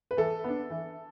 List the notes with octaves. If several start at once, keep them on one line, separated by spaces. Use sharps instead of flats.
B4
E3 A4
B3 D4
E3